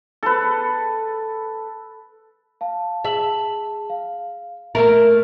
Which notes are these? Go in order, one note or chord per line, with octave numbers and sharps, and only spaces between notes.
A4 B4
F5 A5
G#4 E5 A5 F#7
F5
A3 A#3 A#4 E5